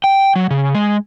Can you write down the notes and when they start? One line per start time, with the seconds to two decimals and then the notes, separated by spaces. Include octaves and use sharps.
0.04 G5
0.36 F#3
0.50 C#3
0.74 G#3